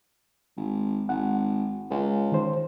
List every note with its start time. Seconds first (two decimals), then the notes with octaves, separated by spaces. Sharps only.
0.57 G#1
1.09 G#1 F#5
1.91 C#2
2.32 D#3 C5